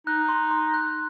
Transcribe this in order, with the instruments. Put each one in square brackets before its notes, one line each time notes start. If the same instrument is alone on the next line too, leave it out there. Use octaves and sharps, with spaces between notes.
[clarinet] D#4 [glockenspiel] F#6
[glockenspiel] C6
C6
F#6